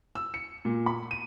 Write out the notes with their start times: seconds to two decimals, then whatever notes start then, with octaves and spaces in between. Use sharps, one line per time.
0.15 E6
0.34 C#7
0.65 A#2
0.86 B5
1.11 D#7